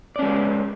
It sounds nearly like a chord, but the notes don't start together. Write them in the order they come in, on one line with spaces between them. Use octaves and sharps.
D5 C#4 G#3 B4